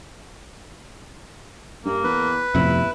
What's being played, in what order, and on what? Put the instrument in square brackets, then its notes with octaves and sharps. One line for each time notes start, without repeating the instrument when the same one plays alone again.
[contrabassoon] G2 [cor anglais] A#3
[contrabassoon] E2 [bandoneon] B4
[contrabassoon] G1 [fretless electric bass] F2 A2 C3 [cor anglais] E4